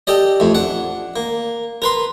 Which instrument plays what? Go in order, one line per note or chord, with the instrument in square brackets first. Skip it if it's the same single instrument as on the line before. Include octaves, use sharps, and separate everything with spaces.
[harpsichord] G4 A4 D5 D#5
F2 A2
D4 F#5
A#3
A#4 B4 C6